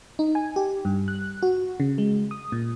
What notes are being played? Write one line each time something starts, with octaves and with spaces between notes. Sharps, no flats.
D#4
G#5
G4
G2
F#6
F#4
C#3
G#3
D#6
A#2